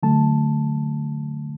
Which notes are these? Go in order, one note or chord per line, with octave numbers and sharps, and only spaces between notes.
D3 F#3 A3 A5